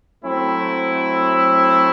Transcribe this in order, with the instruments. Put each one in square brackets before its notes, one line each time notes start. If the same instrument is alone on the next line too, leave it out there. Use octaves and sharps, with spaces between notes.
[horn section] F#3 A3 C4 E4